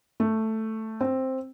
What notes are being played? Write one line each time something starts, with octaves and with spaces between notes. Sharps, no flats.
A3
C4